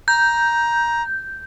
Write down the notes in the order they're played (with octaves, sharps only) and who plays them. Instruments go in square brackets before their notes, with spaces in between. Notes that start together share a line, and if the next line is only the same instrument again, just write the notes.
[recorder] A#5 [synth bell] G6